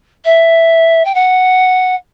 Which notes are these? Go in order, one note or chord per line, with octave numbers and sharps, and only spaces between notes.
E5
G5
F#5